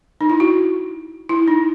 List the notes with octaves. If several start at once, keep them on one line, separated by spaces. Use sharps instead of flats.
D#4
E4
F#4
E4
D#4